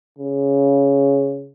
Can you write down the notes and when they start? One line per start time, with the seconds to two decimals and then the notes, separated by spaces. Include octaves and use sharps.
0.19 C#3